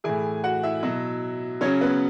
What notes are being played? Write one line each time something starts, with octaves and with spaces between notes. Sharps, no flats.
A2 E3 G#4 G#5
F#4 F#5
E4 E5
B2 F#3
C#3 F#3 C#4 C#5
B3 B4